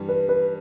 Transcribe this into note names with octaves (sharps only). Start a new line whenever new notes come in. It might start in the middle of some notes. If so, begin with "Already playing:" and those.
Already playing: G2 E3 G3
B4
B4